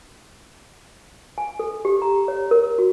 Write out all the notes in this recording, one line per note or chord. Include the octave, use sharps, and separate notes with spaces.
G#5
A4
G4
A#5
C#5
A#4
F#4